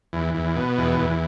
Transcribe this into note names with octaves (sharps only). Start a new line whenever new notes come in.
E2
E2
B2
E2
E2